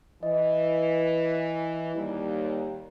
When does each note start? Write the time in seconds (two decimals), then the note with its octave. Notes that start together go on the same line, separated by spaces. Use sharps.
0.23 E3 D#5
1.95 D#2 G3